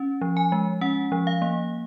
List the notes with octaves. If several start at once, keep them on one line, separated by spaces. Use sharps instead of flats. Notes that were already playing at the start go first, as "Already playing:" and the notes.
Already playing: C#4
F3
G#5
G#3
C#4 F#5
F3
F5
A#3